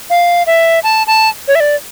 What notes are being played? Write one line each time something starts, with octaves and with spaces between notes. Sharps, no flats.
F5
E5
A5
A5
C#5
E5
D5